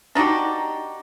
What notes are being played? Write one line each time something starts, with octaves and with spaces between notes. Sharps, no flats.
D4 D#4 F#4 G4